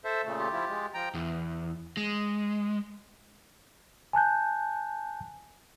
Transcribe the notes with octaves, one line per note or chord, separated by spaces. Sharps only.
A4 C5 E5
A#2 C#3 A3
F4 G4
F3 E4
G#3
F3 G5 A#5
E2
G#3
G#5 A5 F#6 G6